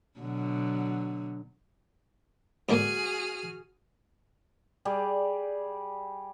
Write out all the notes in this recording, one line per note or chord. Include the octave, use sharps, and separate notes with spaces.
B2 D3 F#3
G#2 D3 A#3 F#4 G#4 F6
G3 G#4 D5